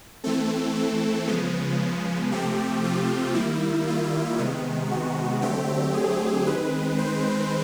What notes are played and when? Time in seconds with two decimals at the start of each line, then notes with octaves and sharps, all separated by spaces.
0.24 E3 A3 C4 A4
0.76 A4
1.27 C#3 F3 G#3 B3
2.32 C3 F3 A3 C4 G4
2.84 F4
3.34 D#3 G3 A#3 E4
3.87 F4
4.38 C3 D#3 G#3 B3
4.91 F#4
5.42 D3 F#3 A3 C4 G4
5.94 G#4
6.46 D#3 G#3 C4 B4
6.98 C5